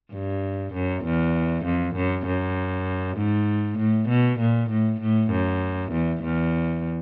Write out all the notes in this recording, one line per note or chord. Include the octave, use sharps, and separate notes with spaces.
G2
F#2
E2
F2
F#2
F#2
G#2
A2
B2
A#2
A2
A2
F#2
E2
E2